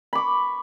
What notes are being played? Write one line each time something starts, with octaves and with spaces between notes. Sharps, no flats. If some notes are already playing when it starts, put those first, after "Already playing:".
B5 C#6 D6